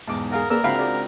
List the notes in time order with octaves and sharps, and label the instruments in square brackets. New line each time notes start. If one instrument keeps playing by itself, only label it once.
[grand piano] B1 E2 G#2 [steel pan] A5 D6
[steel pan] G#4 F5 F#5 [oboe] A#4
[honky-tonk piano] A#3 G#4 [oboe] A#4 [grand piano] B4 D5 [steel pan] E6
[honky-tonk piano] C#2 [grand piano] C4 D4 F#4 [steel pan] E5 F5 B5
[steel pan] G#4 D5